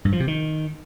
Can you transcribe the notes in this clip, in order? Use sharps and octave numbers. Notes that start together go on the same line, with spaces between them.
G2
F3
C3
D#3